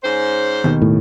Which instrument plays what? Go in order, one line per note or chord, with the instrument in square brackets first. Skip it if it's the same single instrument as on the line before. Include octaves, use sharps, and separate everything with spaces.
[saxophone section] G#2 C#4 C5
[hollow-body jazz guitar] D#2 B2 D#3
[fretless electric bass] A2